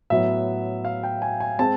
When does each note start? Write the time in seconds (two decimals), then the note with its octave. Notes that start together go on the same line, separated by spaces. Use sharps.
0.10 A2 F#3 B3 E5
0.85 F5
1.03 G5
1.22 G#5
1.40 G#5
1.59 G#3 C4 A5